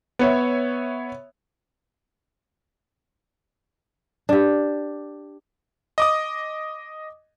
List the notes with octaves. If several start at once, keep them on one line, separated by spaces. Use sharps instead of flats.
B3 C#5 E5
D4 G4
D#5 D6 D#6